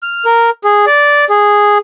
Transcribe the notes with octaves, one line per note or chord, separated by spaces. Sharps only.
F6
A#4
G#4
D5
G#4